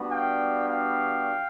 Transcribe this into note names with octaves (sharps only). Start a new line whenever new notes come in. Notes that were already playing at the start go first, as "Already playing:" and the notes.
Already playing: G3 B3 D4 F#4
F5 G5
F5 G5